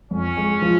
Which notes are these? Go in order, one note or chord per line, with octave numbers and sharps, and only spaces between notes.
F2 C#4
G#3
F3